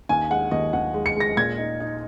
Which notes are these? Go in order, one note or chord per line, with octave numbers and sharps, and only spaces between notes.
D#2 G#5
G#3 F#5
D#2 D#5
D#2 F#5
G#3
C#7
G#3 A#6
A#2 G#6
D#4
D#4